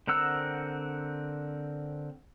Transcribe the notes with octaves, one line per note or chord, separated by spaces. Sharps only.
D3 C4 A#4 F#5 E6